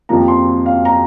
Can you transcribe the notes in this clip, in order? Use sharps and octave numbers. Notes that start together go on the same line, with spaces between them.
F2 C3 F3 A#3 A#5
C6
F5
A#5